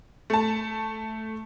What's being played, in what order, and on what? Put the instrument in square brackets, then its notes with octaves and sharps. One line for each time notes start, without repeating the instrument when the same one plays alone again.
[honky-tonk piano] A3 A5